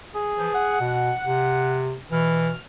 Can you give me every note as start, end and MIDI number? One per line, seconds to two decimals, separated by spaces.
0.15 0.76 68
0.37 0.51 52
0.37 0.51 53
0.55 1.84 78
0.80 1.11 47
1.25 1.94 48
2.11 2.57 47
2.11 2.51 52
2.11 2.57 89